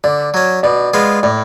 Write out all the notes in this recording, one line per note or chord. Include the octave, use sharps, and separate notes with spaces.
D3 D5
F#3 C#4
B2 D5
G#3 B3 F4
A2 D5